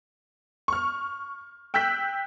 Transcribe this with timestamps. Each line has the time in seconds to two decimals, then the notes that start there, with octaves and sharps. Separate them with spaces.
0.68 C#6 F6
1.74 G5 E6 F#6 G6 B6